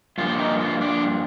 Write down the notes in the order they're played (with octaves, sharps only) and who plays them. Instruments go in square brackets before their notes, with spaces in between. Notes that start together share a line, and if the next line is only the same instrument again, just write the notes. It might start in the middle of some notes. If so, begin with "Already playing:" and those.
[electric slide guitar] G2 F3 A#3 F4
D#4
F4
D4